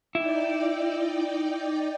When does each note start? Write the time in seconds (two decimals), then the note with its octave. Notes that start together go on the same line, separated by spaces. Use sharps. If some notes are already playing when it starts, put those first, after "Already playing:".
0.15 D#4 E4 D5 G5